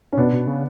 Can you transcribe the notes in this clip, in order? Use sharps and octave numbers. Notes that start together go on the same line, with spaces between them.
C#4
B2 B3 D4
B2
C#3